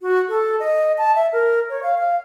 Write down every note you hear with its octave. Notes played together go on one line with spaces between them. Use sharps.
F#4
A4
D#5
A5
E5
A#4
C#5
F5
F5